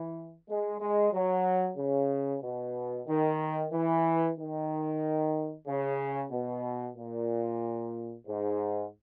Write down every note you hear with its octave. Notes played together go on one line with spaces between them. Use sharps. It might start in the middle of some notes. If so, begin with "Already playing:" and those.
Already playing: E3
G#3
G#3
F#3
C#3
B2
D#3
E3
D#3
C#3
B2
A#2
G#2